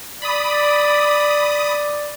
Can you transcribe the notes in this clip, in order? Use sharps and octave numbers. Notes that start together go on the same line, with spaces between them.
D5 B5 D#6